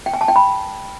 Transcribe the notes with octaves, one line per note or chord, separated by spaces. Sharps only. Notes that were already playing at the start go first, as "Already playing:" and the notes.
G5
G#5
A5
G5
B5